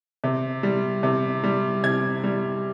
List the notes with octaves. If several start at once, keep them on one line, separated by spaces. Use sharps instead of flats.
C3
G3
C3
G3
C3 G#6
G3